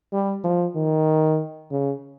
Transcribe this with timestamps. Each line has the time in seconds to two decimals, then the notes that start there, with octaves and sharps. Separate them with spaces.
0.13 G3
0.44 F3
0.75 D#3
1.71 C#3